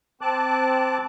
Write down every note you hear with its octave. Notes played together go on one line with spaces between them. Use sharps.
C4 A5 D6 F#6